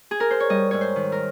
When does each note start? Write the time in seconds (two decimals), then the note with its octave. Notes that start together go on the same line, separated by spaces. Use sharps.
0.11 G#4
0.20 A#4
0.30 C5
0.40 C#5
0.50 G3 D#5
0.71 G#2 C#5
0.81 C5
0.96 D#3
1.12 A#4